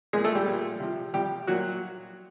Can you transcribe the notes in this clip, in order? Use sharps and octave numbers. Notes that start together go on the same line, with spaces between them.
A#2 F3 G#3 G#4
A3 A4
G3 G4
A#2 F3
C3 F3
C3 F3 G3 G4
A#2 F#3 F#4